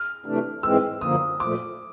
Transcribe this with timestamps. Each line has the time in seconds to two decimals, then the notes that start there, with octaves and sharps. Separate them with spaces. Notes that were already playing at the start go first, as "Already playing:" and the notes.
Already playing: F6
0.26 C3 E3 A3 D4
0.63 G#2 E3 G#3 C4 E6
1.01 F#2 D3 F3 A#3 D#6
1.40 A#2 F3 A3 D6